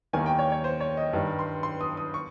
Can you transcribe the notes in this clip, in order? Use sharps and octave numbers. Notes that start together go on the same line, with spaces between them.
D#2 D#3 A#3 G#5
G5
C#5
C#5
C5
C#5
D#5
G2 D#3 G3
C6
C6
D#6
D#6
C#6